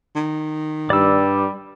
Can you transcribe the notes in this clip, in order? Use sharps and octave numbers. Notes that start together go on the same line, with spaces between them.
D#3
G2 G3 D5 E6